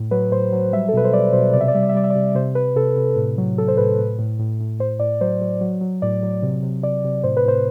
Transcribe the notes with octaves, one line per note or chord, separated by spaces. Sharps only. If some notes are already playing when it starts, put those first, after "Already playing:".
Already playing: A2
F#3 B4
A2 C5
F#3
G3 E5
A4
B2 B4
C5
G3 D5
B2 C5
C3 D5
E5
D5
G3 E5
D5
E5
G3 D5
E5
D5
C3
C3 C5
C3 B4
C3 A4
C3
A2
F#3
F#3 A4
C5
A2 B4
A2
A2
A2
A2
A2 C5
A2 D5
F#3 C5
F#3
F#3
F#3
A2 D5
F#3
C3
C3
C3 D5
C3
A2 C5
B4
A2 C5